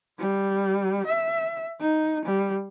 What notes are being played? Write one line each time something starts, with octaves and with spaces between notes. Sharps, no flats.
G3
E5
D#4
G3